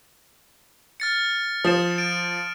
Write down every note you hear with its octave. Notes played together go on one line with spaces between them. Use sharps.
F6 A6 C#7
F3 D#6 E7
D7